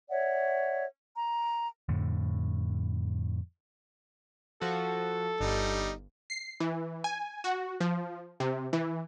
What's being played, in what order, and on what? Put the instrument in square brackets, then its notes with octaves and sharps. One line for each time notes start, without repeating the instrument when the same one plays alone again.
[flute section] C#5 D5 E5 F#5
A#5
[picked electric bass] F2 A2 D3
[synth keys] F3 F#4 [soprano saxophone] A4
[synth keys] G1 [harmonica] G3 D#4
[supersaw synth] C7
E3
G#5
F#4
F3
C3
E3